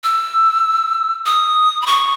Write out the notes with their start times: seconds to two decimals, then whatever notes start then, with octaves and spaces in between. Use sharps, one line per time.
0.04 E6
1.26 D#6
1.82 B5
1.86 C#6